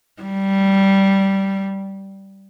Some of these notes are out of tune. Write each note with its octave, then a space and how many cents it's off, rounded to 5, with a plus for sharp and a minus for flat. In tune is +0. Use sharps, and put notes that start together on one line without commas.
G3 -10